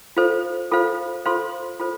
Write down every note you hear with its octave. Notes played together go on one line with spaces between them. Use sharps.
F4 A4 C5 F5
F4 A4 C5 F5
F4 A4 C5 F5 C6
F4 A4 C5